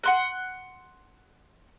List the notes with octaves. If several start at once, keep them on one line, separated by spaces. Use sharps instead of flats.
F#5 C6 F#6